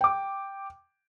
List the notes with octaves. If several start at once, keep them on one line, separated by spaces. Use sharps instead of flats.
G5 D6